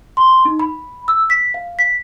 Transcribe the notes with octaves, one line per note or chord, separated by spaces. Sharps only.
C6
D#4
B5
E6
B6
F5
B6